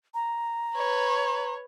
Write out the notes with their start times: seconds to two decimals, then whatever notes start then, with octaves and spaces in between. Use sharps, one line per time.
0.14 A#5
0.76 B4 C#5